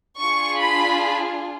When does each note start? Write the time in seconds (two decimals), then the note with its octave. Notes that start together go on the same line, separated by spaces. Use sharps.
0.20 D4 F4 G#4 C#6
0.59 B5